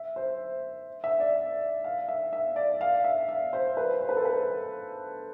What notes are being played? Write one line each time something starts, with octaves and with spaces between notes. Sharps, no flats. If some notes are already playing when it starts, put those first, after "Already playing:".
Already playing: E5
C5
E5
D5
F5
E5
E5
D5
F5
E5
E5
C5
B4
C5
B4
A4
B4